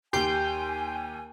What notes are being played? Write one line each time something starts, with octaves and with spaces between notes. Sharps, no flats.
D#2 G4 G5 G#5 C6 G6